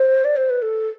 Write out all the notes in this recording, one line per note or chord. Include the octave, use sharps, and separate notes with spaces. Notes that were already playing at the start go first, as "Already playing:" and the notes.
Already playing: C5
D5
C5
B4
A4